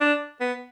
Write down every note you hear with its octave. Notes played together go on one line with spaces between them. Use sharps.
D4
B3